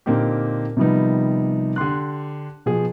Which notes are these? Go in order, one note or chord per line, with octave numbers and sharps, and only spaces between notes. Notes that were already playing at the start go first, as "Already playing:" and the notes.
A#2 D3 A#3 C4 D#4 G4
C3 D#3 F3 G3 B3 D#4
D3 G4 C6 F#6
B2 F3 G#4